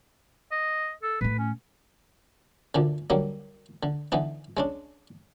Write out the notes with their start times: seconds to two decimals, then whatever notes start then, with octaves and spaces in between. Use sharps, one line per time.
0.52 D#5
1.03 A4
1.21 A2 A3 B4
1.38 C#4
2.75 D2 A#2 D3
3.10 D3 F#3 G3 A#3
3.83 D3
4.12 D3 E3 B3 D#4
4.57 G#3 C#4 D4